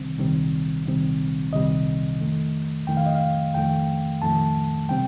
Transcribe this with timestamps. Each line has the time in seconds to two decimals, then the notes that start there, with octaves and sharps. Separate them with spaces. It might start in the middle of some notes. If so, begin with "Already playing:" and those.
Already playing: C2 C3 D#3 G3 C4
0.18 C2 C3 D#3 G3 C4
0.85 C2 C3 D#3 G3 C4
1.52 C2 C3 D#3 G3 C4 D#5
2.20 F2 D#3 A3
2.87 F2 D#3 A3 G5
2.97 F5
3.06 D#5
3.15 F5
3.55 F2 D#3 A3 G5
4.22 F2 D#3 A3 A5
4.89 C3 G3 C4 G5